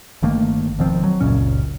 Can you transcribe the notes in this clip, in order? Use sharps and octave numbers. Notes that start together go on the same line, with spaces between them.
G1 D#3 A3 A#3
E1 D#3 F3 C4
F#3
F#1 C#2 A#2 C#4